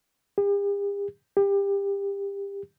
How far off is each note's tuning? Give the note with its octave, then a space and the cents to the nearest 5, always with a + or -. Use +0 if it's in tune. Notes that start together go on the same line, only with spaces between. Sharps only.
G4 +45
G4 +25